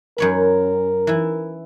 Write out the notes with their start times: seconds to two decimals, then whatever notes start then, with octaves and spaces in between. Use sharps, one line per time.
0.18 F#2 A#4 C#5 B5
1.07 E3 E4